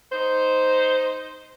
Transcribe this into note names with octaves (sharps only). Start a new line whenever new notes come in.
D#4 C5